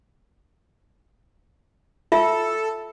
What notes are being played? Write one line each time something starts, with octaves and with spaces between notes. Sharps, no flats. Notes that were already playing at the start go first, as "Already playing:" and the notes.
F4 A4 E5